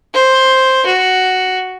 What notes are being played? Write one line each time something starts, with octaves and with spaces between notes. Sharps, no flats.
C5
F#4